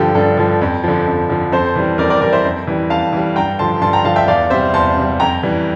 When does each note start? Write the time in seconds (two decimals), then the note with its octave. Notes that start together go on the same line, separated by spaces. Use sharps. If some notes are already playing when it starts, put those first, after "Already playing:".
Already playing: G2 D3 F3 G4 A4
0.15 G2 A4
0.37 D3 F3
0.61 F2
0.84 D3 F3
1.07 F2
1.30 D3 F3
1.52 F2 A4 C5
1.76 E3 G3
1.98 F2 A#4 D5
2.10 A#4 D5
2.21 E3 G3 A#4 D5
2.32 C5 E5
2.45 F2
2.67 E3 G3
2.90 F2 F5 A5
3.13 E3 G3
3.36 G2 G5 A#5
3.59 D3 F3 A5 C6
3.82 G2 A5 C6
3.93 G5 A#5
4.05 D3 F3 F5 A5
4.16 E5 G5
4.28 E2 D5 F5
4.50 C3 G3 C5 E5
4.74 E2 A5 C6
4.97 C3 G3
5.20 F2 G5 A#5
5.43 E3 G3